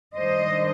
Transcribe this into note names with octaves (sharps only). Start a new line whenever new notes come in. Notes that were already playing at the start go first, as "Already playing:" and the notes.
D#3 G3 D4 C5 D#5